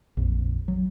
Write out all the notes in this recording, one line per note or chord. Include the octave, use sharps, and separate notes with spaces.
A#1 F2
F#3